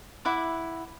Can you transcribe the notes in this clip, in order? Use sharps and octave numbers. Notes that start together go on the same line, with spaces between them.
E4 E5 F#5 D6